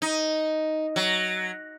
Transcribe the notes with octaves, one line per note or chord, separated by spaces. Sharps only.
D#4
F#3